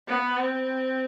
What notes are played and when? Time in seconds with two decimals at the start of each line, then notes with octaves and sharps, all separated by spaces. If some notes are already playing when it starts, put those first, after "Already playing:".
0.08 B3
0.37 C4